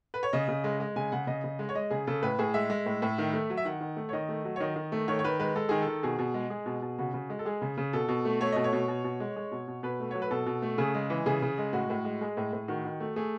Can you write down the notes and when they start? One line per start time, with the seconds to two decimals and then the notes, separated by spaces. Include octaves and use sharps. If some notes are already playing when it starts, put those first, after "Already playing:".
0.14 B4
0.23 C#5
0.33 C#3 D#5
0.48 C#3
0.64 G#3
0.80 G#3
0.96 C#3 G#5
1.12 C#3 F#5
1.27 C#3 D#5
1.44 C#3
1.59 G#3
1.69 C#5
1.75 G#3 D#5
1.90 C#3 G#4
2.07 C#3 A4
2.22 A2 B4
2.39 A2 G#4
2.54 G#3 E5
2.70 G#3
2.86 A2
3.02 A2
3.18 D#3
3.33 A3
3.50 F#3
3.57 E5
3.65 D#3 F#5
3.81 D#3
3.96 A3
4.09 C#5
4.13 D#3 D#5
4.29 A3
4.45 F#3
4.56 C#5
4.60 D#3 D#5
4.76 D#3
4.92 A3
5.08 D#3 C#5
5.19 C#5
5.24 D#3 B4
5.39 G#3 B4
5.55 G#3 A4
5.69 D#3 G#4
5.82 A4
5.87 D#3
6.03 B2 G#4
6.19 B2
6.34 G#3
6.50 G#3 G#4
6.66 B2
6.82 B2
6.99 C#3 F#4
7.14 C#3
7.30 G#3
7.39 A4
7.45 G#3 G#4
7.62 C#3
7.77 C#3
7.93 B2 A4
8.08 B2
8.25 A3
8.41 A3 C#5
8.52 B2 D#5
8.64 C#5
8.73 B2
8.88 B2
9.04 B2
9.20 G#3
9.36 G#3
9.52 B2
9.68 B2
9.83 B2 B4
10.00 A3
10.11 F#3 C#5
10.22 B4
10.31 B2 A4
10.46 B2
10.62 A3
10.78 C#3 G#4
10.94 G#3
11.10 E3
11.26 C#3 G#4
11.42 C#3
11.58 G#3
11.73 A2 F#4
11.90 A2
12.05 G#3
12.21 G#3 G#4
12.37 A2
12.53 A2
12.68 D#3 F#4
12.85 D#3
13.00 A3
13.16 A3 G#4